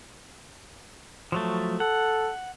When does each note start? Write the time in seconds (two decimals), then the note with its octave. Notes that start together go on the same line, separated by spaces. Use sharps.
1.32 F3 F#3 A3
1.80 A4 F#5